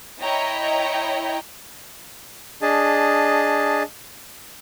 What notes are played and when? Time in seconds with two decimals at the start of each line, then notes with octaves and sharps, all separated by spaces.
0.21 E4 C#5 D#5 G5 A#5
2.62 D4 G#4 D#5 A5